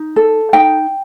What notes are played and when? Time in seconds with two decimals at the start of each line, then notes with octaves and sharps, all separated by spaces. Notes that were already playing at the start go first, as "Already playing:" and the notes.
Already playing: D#4
0.16 A4
0.53 D#4 G5